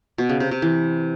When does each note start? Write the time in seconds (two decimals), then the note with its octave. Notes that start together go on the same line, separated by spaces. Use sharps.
0.18 B2
0.29 C#3
0.40 C3
0.51 C3
0.62 E3